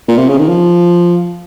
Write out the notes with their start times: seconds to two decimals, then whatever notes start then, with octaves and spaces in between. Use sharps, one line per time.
0.08 A#2
0.18 C3
0.29 C#3
0.39 D#3
0.49 F3